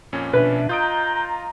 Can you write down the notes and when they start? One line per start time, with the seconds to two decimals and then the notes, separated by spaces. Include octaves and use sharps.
0.13 F2 A#2 C#4
0.33 B2 D4 B4 E5
0.69 F4 D#5 A#5 D#6 G6 D7